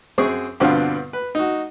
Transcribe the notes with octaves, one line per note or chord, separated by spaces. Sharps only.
F#2 C4 G#4 C#6 D#6
G2 B2 D3 B3 C4 F4
B4
D#4 F#4